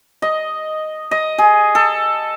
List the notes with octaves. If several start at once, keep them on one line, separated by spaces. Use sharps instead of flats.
D#5
D#5
G#4
A4